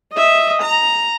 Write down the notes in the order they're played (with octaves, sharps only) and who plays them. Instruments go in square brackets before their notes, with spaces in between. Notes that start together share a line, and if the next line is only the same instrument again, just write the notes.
[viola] D#5 E5
A#5